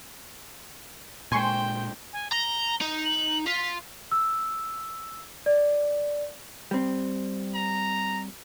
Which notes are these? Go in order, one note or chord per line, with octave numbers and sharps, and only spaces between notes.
A#2 G#3 C5 G5 G#5 C6 C#6
G#5
A#5 G7
D#4
F#7
F4 B6
E6
D5
G3 C4
A#5